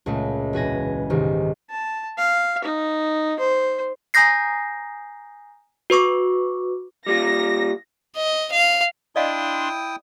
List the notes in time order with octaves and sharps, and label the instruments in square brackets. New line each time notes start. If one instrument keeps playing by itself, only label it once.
[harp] C#2 A#2 G#3 A3
E1 B4 G#5 A#6
C2 G#2 C3 D#3
[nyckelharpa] A5
F5
D#4
C5
[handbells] G#5 A#5 D#6 G6 A#6 C7
F#4 B4 C#6 D6
[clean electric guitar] G3 A#3 F4 [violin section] A#6
[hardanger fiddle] D#5
F5
[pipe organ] D4 C6 [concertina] E4 G5 D#6 [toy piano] D5 D#5 F5